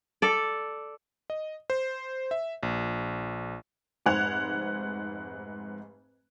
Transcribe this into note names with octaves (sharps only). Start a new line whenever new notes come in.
A4 D5
D#5
C5
E5
A#1
F1 G#2 C5 F#5 G#6 F7